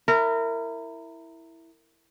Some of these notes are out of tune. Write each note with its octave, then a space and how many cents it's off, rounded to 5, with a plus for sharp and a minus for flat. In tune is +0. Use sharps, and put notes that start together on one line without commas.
E4 +0 A#4 -25